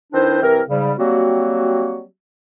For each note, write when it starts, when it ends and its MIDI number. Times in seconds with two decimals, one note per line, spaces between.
0.13 0.41 51
0.13 0.41 60
0.13 0.41 62
0.13 0.41 64
0.13 0.41 71
0.13 0.41 72
0.42 0.60 36
0.42 0.60 52
0.42 0.60 60
0.42 0.60 70
0.69 0.92 44
0.69 0.92 49
0.69 0.92 55
0.98 2.03 54
0.98 2.03 55
0.98 2.03 58
0.98 2.03 60
0.98 2.03 66